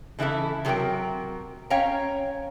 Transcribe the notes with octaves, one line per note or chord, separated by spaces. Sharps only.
C#3 E3 D4 E4 A4
C3 F#3 G4 A#4 G5
C#4 C#5 F5 G5 A#5